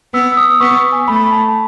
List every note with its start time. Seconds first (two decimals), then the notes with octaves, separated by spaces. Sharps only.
0.13 B3 E6
0.32 E6
0.37 D#6
0.61 B3 C#6
0.77 C#6
0.92 G#5
1.08 A3 B5
1.31 A5
1.48 A5